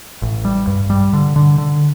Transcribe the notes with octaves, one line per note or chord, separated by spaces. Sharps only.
A1
G3
G2
G3
D3
D3
D3